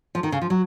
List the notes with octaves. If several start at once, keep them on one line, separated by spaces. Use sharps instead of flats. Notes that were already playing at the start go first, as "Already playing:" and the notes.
F3
D#3
C#3
F3
F#3